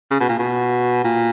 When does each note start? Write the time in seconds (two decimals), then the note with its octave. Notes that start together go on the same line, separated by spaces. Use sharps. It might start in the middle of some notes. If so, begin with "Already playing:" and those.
0.11 C#3
0.20 B2
0.29 A#2
0.39 B2
1.05 A#2